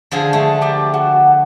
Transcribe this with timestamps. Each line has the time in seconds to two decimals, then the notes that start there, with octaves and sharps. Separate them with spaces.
0.11 D3 F3 G#4
0.33 A3
0.62 G4 A5 A#5
0.94 F#4